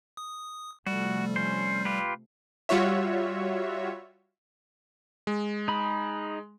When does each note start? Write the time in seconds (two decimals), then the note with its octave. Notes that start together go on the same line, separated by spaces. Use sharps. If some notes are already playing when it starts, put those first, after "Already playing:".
0.17 D#6
0.86 C3 F3 G3 A3 F#4
1.36 C#4 C5
1.85 F4 G4 B4
2.69 G3 F4 F#4 C#5 E5
5.27 G#3
5.68 D#4 B5